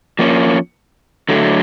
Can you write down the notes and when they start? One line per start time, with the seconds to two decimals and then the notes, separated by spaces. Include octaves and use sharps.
0.19 F3 A#3 C#4
1.29 D3 F#3 A3